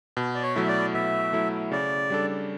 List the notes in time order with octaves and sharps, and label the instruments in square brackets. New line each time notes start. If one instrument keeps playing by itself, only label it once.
[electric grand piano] B2
[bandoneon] D5
C#5
[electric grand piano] F#3 A3 E4 [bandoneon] E5
[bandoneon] D5
[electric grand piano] B2 [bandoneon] E5
[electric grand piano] F#3 A3 E4
[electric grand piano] C#3 [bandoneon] D5
[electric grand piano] G3 D4 A4